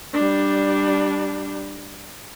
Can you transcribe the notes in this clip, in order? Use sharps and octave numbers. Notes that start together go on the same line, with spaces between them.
G3 D4